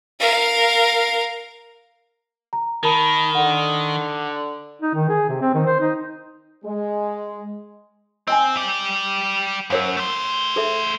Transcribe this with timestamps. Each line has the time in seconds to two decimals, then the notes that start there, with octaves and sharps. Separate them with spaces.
0.20 A#4 F5
2.53 A#5
2.83 D#3 A#4 A5 B5
3.35 D3 F#5
4.82 D#4
4.94 D#3
5.09 G#4
5.29 C3
5.41 C4
5.54 D#3
5.66 C5
5.81 D#4
6.65 G#3
8.27 C4 D#5 G5 G#5
8.57 G4 D5
9.70 F#2 A#4 C#5 F5
9.97 A3 C5
10.56 G#4 A4 E5